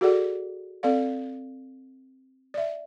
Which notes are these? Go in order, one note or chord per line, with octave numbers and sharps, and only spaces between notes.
F#4 G#4 A4 D5 F#5
C4 A4 D5 F5
D5 E5